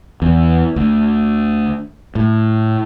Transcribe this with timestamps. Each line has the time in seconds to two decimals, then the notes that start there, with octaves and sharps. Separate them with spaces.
0.22 E2
0.76 D2
2.16 A2